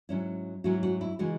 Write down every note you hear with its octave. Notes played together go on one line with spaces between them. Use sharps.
G#2 F#3 C#4 E4
G#2 F#3 C#4 E4 F#4
F#4
E4
C#3 E3 G#3 D#4 F#4